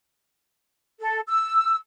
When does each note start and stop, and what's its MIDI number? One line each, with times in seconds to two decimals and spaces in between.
1.00 1.20 69
1.29 1.77 88